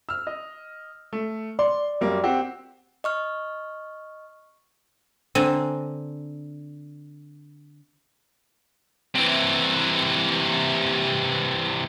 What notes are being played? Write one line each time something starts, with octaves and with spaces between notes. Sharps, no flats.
E6 F6
D#5
A3
D5 C6
F#2 G3 A#3
C4 F#4 G4
D#5 C#6 F6
D3 C4 G#5 A#5
C3 E3